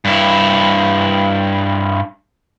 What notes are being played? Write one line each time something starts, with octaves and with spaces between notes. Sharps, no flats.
G2 E4